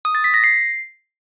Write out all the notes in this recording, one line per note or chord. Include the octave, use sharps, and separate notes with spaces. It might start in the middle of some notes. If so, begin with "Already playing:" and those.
D#6
A6
B6
A#6
C7